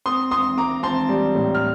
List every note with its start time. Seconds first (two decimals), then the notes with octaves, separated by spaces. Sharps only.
0.06 C4 C6 D#6
0.31 C4 C6 D#6
0.57 C4 A#5 D6
0.83 C4 A5 C6
1.09 G3
1.35 A2
1.55 F6